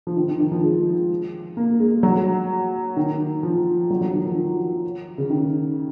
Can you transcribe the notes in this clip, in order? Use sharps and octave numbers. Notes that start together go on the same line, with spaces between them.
F3
D#3
D#3
D#3
F3
G#3
A#3
G#3
F#3
D#3
F3
F#3
F#3
D#3
F3
C#3
D#3